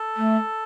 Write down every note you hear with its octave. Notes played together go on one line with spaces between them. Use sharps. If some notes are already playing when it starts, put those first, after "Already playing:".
Already playing: A4
A3